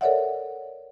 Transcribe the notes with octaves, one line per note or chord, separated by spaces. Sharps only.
A4 A#4 C#5 D5 E5 F#5